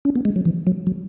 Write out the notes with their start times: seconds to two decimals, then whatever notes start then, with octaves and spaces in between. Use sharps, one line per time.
0.05 C#4
0.16 B3
0.25 G#3
0.36 F#3
0.45 E3
0.67 F#3
0.87 F#3